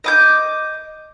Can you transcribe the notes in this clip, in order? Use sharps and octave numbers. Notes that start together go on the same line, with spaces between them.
D#5 D6 G6